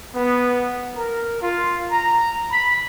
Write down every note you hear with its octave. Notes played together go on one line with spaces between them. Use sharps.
B3
A#4
F4
A#5
B5